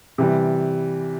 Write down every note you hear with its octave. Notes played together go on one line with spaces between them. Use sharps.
C3 E3 G3